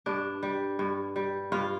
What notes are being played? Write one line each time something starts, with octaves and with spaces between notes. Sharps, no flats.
G2 D4
G3
G2
G3
G2 F4